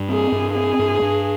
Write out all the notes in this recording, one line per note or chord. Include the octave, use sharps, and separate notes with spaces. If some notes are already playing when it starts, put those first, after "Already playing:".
Already playing: G2
C4 G#4
G2
C4 G#4
G2
G2